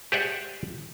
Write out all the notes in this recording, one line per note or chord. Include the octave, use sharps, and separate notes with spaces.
G4 G#4 C5 D5 E5 F#5